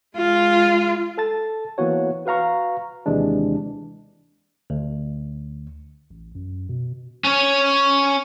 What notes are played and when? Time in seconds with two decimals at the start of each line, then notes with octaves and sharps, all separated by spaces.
0.16 G#3 F4
1.18 A4 A5 A6
1.78 E3 A#3 B3 F#4 C#5
2.26 F#4 B4 F5 A#5 C#6
3.06 D#2 C3 E3 G#3 D4
4.70 D2
6.10 A1
6.35 F#2
6.69 B2
7.24 C#4 C#5